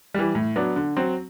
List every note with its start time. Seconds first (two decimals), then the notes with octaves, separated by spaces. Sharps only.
0.14 E3 G3
0.35 A2
0.56 F#3 B3 D4
0.76 D3
0.97 F#3 C4